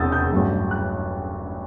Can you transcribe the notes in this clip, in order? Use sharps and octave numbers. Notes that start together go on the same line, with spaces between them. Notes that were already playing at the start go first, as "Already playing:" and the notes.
Already playing: E1 E2 C3 D#6 E6 G6 A6
G6
A1 G2 F#3
F#6